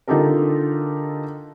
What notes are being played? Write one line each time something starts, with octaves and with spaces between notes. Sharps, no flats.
D3 D#4 F4 G4 A4 A#4